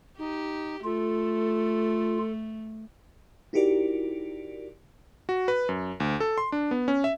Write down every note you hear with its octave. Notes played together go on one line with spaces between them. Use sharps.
D#4 G4
A3 F4 A4
D#4 E4 F#4 G4 A#4 D5
F#4
B4
F#2
D2
A4
C6
D4
B3
C#4
E5